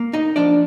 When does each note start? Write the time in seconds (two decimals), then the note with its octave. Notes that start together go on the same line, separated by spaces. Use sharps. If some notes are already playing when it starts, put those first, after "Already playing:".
Already playing: A#3
0.13 D#4 D#5
0.36 F3 D4 D5